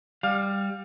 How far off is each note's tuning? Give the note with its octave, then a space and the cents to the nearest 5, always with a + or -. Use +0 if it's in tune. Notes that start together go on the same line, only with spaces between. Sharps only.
G3 +15 F5 +20